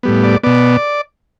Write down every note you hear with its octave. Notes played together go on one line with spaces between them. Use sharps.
A2 G3 B3
D5
B2 B3 D5